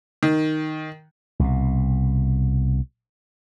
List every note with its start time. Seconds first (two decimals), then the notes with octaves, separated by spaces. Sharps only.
0.23 D#3
1.40 C2 B2